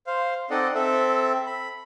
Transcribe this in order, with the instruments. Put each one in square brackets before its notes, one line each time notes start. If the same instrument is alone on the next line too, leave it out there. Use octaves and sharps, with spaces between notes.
[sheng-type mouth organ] C5 F5
C4 D#4 A4 D5 D#5 F#5
C4 A4 E5
B5